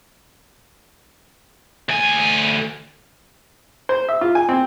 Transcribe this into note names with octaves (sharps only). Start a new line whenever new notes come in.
D2 G#5
C5
E5
F4
G#5
C4